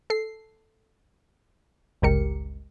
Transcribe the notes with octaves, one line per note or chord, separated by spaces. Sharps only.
A4 C7
G1 C#2 G#3 G4 A#4 C#7